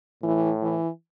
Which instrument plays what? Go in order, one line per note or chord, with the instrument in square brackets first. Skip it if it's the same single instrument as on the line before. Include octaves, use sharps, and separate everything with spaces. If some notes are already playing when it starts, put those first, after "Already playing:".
[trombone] A2 [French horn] E3
[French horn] E3